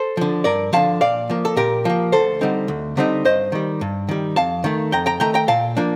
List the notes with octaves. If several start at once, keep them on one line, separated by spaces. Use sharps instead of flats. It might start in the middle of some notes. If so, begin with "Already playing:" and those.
Already playing: A4 C5
D3 F3
G2 A#4 D5
D3 F3 F5 A5
A#2 D5 F5
F3 A#3
A4
A#2 G4 A#4
F3 A#3
D2 A4 C5
D3 G3 C4 D#4
D2
D3 G3 C4 D#4
G2 C5 D#5
D#3 G3
G2
D#3 G3
F2 F5 A5
D#3 A3
F2 G5 A#5
G5 A#5
D#3 A3 G5 A#5
G5 A#5
A#2 F5 A5
F3 A#3 D4